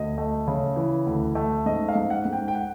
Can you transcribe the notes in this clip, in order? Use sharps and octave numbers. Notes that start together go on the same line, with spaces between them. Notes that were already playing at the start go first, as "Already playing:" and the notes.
Already playing: D2 D#5
A3
C#3
E3
D2
A3
G#2 D#5
F5
G#2
F#5
G#2
G5
G5
F#5